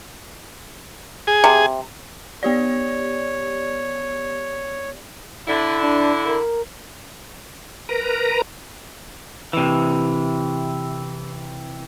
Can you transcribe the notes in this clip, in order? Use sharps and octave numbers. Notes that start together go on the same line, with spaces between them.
G#4
C3
B3 G4 C#5 D5
D3 E4
D4
A#4
A#4 B4 A#5
C3 E3